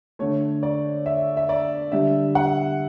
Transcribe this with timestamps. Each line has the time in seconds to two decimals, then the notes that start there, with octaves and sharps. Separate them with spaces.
0.19 D3 A3 C#5
0.63 D5
1.06 E5
1.37 E5
1.49 D5
1.92 D3 G3 E5
2.35 F#5